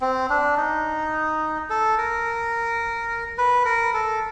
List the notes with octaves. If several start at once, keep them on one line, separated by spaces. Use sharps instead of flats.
C4
D4
D#4
A4
A#4
B4
A#4
A4